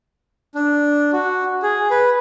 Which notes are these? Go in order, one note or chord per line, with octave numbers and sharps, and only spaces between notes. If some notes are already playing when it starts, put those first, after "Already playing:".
D4
F#4
G#4
B4